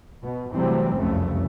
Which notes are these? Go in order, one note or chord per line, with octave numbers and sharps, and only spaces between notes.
B2
C3 E3 F#3 G3 A3 C4
F1 C2 F#2 C#3 A3